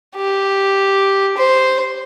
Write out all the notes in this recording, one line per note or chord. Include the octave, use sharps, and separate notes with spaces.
G4
C5